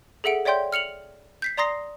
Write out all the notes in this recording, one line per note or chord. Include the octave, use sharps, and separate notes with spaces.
G#4 A4 E5 F#5 D7
C#5 D5 E5 G5 C6 G6
F6 C#7 F7 F#7
G6 B6 C7
D5 A#5 C6 D#6 A#6 C7